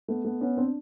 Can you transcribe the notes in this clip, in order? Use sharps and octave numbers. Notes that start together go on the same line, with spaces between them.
A3 B3
A3 B3
B3 C#4
C4 D4